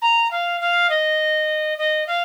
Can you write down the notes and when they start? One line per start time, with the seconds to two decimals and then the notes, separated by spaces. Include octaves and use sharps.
0.02 A#5
0.31 F5
0.61 F5
0.90 D#5
1.78 D#5
2.07 F5